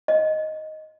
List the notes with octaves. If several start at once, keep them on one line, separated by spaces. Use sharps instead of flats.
D#5